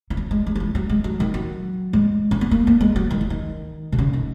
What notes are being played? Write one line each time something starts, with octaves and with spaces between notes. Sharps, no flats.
E3
F#3
G#3
G#3
F#3
E3
F#3
G#3
F#3
D#3
F#3
G#3
C#4
B3
A#3
A#3
G#3
F#3
D#3
E3
D#3
B2
C#3
D#3